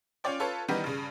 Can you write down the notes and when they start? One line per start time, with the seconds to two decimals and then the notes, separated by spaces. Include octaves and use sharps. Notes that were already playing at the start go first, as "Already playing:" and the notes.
0.24 C#4 F4 C#5 D5 G5
0.40 F4 A4 B4 C#5
0.68 D#3 E3 G3 B3 D#4 B4
0.84 G2 C#3